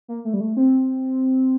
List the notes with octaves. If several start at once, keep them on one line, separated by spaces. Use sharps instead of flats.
A#3
A3
G3
A3
C4